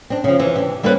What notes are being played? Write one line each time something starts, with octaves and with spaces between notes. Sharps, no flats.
C4 D4
C#3 F3
C3 E3
D4 G4
G3 A#3 C4 C#4 B4